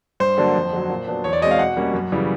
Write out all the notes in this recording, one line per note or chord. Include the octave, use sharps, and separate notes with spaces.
G2 C5
D3 F#3 A#3 D4
F2
D3 F#3
A#2
F#3 B3 D4
E2 C#5
D5
B2 G#3 C4 D#5
F5
B2 F#5
G3 A#3 C#4
F#2
C#3 E3 G3